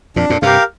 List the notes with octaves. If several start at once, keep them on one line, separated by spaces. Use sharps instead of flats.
F2 A#2 D4
F2 A#2
G2 C3 G4 A#4 F5